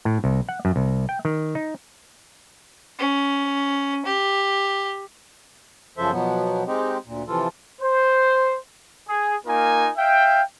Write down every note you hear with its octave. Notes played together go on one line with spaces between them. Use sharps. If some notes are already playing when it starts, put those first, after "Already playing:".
A2
C2
F#5
F#2
C2
G5
D#3
D#4
C#4
G4
F#2 C#3 F3 A4 C5 E5
B2 F3 F#3 B3
G#3 C4 D#4 G4
D2 A#2
C3 E3 F3 F4 A4
C5
G#4
A#3 D#4 F4 A#4 G#5
E5 F5 G5